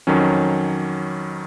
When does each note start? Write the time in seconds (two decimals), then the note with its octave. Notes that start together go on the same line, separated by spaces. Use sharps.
0.07 F2 D#3 F#3 C#4